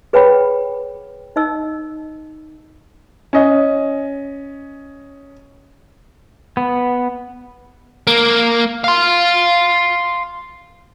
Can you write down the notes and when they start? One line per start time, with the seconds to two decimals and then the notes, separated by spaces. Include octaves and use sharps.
0.13 G#4 B4 C#5 F#5 G5 B5
1.36 D#4 D#5 E6
3.33 C#4 D#5
6.57 B3
8.07 A#3
8.84 F5 C6